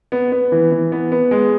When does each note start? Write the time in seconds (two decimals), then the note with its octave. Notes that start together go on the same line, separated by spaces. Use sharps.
0.12 B3
0.32 B3
0.52 E3
0.72 E3
0.92 B3
1.12 B3
1.31 G#3